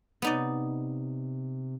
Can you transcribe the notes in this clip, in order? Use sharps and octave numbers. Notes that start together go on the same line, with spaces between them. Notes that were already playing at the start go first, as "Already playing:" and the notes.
C3 B3 D#4 D5